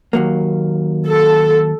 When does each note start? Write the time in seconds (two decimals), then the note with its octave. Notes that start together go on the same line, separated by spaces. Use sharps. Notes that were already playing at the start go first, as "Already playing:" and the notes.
0.13 D#2 F#3 A#3
1.07 A4